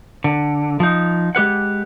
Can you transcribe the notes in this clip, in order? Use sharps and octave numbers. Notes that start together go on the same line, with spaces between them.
D3
F3 D#4
G#3 G4 B4 F#5